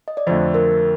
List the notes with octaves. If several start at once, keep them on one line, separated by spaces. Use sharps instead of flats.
D#5
D5
F2 D3 A3 C5
A#4